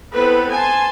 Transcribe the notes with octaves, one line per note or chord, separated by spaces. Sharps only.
B3 C4 E4 A4 B4
G#5 A5 C6